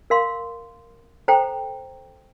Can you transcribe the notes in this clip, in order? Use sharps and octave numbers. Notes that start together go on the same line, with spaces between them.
A#4 F5 C6
A4 C5 G5 A#5